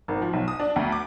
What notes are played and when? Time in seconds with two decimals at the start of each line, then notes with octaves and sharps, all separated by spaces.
0.08 G#1
0.22 F3
0.33 B1
0.48 D#6
0.60 D4
0.76 D2
0.92 D6